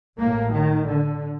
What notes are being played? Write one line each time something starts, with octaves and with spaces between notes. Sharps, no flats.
A1 A2 A#3
D#3
D3